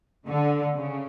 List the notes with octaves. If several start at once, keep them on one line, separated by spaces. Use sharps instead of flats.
D3
C#3